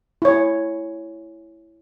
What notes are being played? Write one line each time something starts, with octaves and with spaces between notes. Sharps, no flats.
E4 C#5